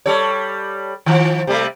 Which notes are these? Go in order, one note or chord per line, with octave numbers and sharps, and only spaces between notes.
G3 A4 C#5
D#3 F3
C3 G3 A3